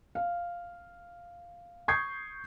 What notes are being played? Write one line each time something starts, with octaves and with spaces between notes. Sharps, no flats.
F5
C#6 D#6 G6 G#6 C7